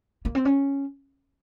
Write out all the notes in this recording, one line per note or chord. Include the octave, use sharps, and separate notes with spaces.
A#3
C4
C#4